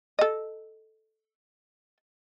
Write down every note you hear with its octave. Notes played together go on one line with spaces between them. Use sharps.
A4 D#5